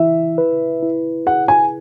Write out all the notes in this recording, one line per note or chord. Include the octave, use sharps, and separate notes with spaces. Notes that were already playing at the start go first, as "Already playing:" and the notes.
Already playing: E3 E4 E5
B4
E4
G#4 F#5
G#5